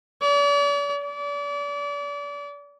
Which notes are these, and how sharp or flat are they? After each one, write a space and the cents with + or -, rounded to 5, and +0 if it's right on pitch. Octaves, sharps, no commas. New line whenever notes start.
D5 -45
D5 -35